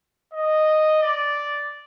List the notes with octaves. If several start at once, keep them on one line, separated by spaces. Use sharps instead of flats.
D#5
D5